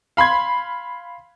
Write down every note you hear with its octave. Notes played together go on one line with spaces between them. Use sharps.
F5 B5 C6 G#6